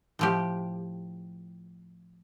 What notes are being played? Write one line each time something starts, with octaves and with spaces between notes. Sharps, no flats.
A2 F3 G4